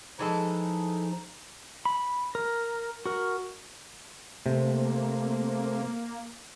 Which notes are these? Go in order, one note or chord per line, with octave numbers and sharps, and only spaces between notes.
E3 F3 G#3 D#4 A4
B5
A#4
F#4 A#4
C3 A3 A#3 C4